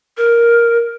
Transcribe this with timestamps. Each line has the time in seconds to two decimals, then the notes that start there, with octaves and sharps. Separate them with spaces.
0.17 A#4